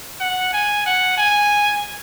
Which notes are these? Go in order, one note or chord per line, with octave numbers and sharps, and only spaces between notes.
F#5
G#5
F#5
G#5